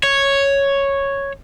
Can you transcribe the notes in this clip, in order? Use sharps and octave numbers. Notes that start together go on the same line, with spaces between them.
C#5